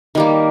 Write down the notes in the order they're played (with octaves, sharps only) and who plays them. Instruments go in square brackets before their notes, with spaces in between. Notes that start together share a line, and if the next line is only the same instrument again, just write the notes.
[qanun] D#3 G3 A#3